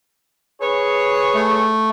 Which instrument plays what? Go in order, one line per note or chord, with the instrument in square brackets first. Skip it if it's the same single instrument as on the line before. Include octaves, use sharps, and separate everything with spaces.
[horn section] G#4 B4 C#5
[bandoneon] A3